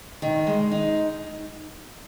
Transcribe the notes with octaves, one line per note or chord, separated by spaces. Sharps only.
D#3
G#3
D#4